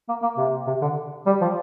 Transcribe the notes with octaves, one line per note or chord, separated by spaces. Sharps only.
A#3
A#3
C3
C3
D3
G3
F3